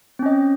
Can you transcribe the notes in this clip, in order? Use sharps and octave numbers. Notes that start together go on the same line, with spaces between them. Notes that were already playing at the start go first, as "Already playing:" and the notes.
C4 C#4 D#5